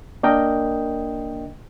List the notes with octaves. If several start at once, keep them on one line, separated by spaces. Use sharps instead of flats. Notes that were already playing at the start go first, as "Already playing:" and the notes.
A#3 D4 A#4 D#5 G5